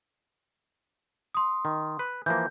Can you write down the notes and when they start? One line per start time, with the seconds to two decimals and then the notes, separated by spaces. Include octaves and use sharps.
1.35 C6 D#6
1.65 D#3
1.99 B4
2.26 E3 F3 A#3 G6